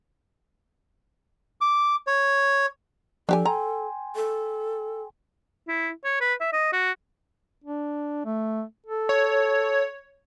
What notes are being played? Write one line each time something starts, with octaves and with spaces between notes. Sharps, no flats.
D6
C#5
F3 D4 G4 A4 G#5
G5 G#5 A#5 C6
A4
E4
C#5
B4
E5
D#5
F#4
D4
A3
A4
C#5